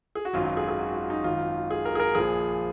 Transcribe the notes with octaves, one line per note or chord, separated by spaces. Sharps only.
G#4
F#4
G#1 F#2 D#3 F#3 F4
F4
G#4
G#4
F#4
F4
D#4
G#1 F#2 D#3 F4
G#4
A#4
G#4
A#4
A#1 A#2 F3 G#4